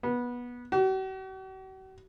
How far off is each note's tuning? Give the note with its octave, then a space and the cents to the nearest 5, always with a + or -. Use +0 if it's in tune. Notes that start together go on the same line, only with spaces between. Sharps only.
B3 -20
F#4 +45